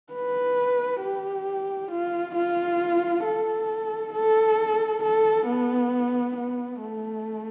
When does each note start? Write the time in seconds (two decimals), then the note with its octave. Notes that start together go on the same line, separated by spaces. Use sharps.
0.13 B4
1.02 G4
1.91 F4
2.35 F4
3.25 A4
4.14 A4
5.03 A4
5.47 B3
6.36 B3
6.81 A3